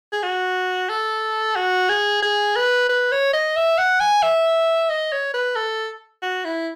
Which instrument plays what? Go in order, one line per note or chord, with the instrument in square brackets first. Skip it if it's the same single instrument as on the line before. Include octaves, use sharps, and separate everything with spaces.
[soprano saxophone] G#4
F#4
A4
F#4
G#4
G#4
B4
B4
C#5
D#5
E5
F#5
G#5
E5
D#5
C#5
B4
A4
F#4
E4